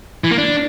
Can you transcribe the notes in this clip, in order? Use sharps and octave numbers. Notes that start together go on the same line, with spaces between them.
E3
A#3
D4